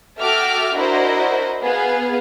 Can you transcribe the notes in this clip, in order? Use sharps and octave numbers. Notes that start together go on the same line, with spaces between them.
F#4 A4 E5 G5 D6 F6
D4 E4 F#4 A#4 C5 D#5
B3 G#4 F5